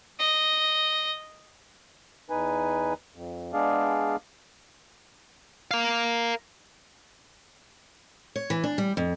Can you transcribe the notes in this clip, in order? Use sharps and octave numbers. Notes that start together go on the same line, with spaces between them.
D#5
E2 D#4 B4 G#5
F2
G#3 B3 D4 G#4 D5 F5
A#4 F5
C#5
E3
D4
G3
F2